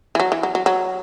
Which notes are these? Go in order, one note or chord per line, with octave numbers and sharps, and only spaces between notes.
E3
F#3
E3
F#3
F#3
F#3